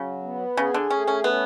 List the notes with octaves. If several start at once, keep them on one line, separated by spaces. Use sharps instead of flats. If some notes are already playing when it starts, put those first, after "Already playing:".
Already playing: C#3 F#3
B3
C#3 G#4
D3
A3 C#4
C#4
B3 C#4